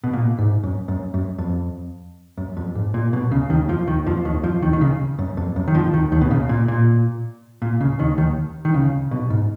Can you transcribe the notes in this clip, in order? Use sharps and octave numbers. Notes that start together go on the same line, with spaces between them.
B2
A#2
G#2
F#2
F#2
F#2
F2
F#2
F2
G#2
A#2
B1 B2
C#2 C#3
D#2 D#3
F2 F3
D#2 D#3
F2 F3
D#2 D#3
F2 F3
D#2 D#3
D#3
C#2 C#3
F#2
F2
F#2
D#3
F2 F3
D#2 D#3
D#2 D#3
B2
C#2 C#3
A#2
A#2
A#2
C#2 C#3
D#2 D#3
D#2 D#3
D#3
C#2 C#3
B1 B2
G#2